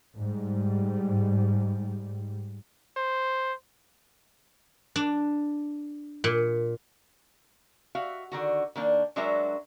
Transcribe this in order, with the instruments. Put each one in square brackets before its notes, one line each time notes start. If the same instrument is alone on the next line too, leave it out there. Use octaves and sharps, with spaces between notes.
[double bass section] G#2 G3
[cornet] C5
[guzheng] D4
A#2
[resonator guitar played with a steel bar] F#4 E5 F5
D3 D#3 F#4
D#3 A#3 D4
F#3 G#3 D4 F#4 A#4 E5